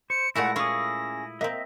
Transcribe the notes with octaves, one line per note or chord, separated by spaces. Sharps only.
C5 C#7
A#2 G#3 A3 E4 F#4 F#5 A5 A#6
C#4 E4 F4 G#4 D#6
A#3 C4 D#5 E5 A#5